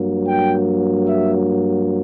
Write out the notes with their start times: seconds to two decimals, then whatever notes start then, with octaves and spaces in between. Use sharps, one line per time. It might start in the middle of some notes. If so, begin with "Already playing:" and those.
Already playing: G2 F#3 A#3
0.25 G5
1.06 E5